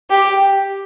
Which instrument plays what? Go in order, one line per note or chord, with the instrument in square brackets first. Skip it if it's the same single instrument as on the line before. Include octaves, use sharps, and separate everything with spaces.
[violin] G4